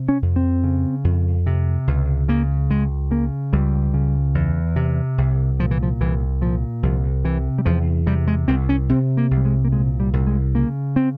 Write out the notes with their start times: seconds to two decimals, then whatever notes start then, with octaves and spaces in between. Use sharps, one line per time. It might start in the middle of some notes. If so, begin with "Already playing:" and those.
Already playing: C3
0.09 C#4
0.22 F2
0.36 C4
0.64 C#3
1.04 F2
1.46 C3
1.87 C#2
2.28 C#3 A#3
2.70 C#2 G#3
3.11 C#3 A#3
3.53 C#2 G3
3.94 C#3
4.35 E2
4.76 C3
5.18 C2
5.59 A#2 F3
5.71 E3
5.83 F3
6.01 C2 E3
6.41 A#2 F3
6.83 C2 F3
7.25 C3 E3
7.58 G3
7.65 E2 F3
8.06 C3 G3
8.27 G#3
8.48 C2 C4
8.69 C#4
8.89 C3 C4
9.17 A#3
9.31 C2
9.37 G3
9.45 G#3
9.65 A#3
9.72 A#2 G#3
10.00 G3
10.13 C2
10.27 G#3
10.55 C#3 A#3
10.96 C4